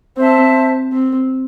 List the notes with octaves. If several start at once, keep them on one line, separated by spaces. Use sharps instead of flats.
C4 C5 E5 A5
C4